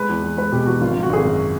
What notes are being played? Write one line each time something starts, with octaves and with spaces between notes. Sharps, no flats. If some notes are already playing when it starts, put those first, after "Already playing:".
Already playing: G#3 B4
E2
E2
G#3 B4
B2 G4
E2 F#4
G#1 F4
G#1 F4
F#4
G#1 G#4
F#2